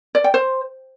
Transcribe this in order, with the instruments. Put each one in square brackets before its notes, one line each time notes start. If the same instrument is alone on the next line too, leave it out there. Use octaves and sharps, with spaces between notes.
[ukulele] D5
G5
C5